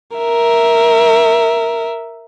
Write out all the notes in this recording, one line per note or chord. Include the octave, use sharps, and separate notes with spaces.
A#4 E5